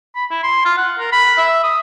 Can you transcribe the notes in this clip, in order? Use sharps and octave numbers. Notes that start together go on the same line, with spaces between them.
B5
E4
C6
F4
F#5
A#4
B5
E5
D#6